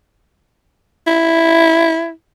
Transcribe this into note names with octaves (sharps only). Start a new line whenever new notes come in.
E4